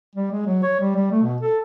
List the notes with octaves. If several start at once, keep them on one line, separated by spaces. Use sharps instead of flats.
G3
G#3
F#3
C#5
G3
G3
A3
B2
A4